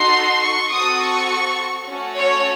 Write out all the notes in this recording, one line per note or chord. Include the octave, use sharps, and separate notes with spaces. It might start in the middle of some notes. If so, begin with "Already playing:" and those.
Already playing: D#4 F#4 A4 C6
C#6
C4 F#4 A4 D#6
C#6
A3 C#4 F#4 A4
C#5